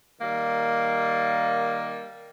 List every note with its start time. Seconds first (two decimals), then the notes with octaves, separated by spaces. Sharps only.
0.21 D#3 G3 A#3